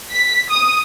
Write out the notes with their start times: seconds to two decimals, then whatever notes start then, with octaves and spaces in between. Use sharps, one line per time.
0.12 B6
0.50 D#6